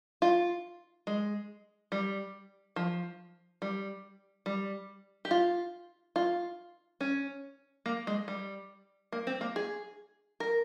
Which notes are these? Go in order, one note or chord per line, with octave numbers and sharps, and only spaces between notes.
F4
G#3
G3
F3
G3
G3
G4
F4
F4
C#4
A#3
G#3
G3
A#3
C4
A#3
G#4
A#4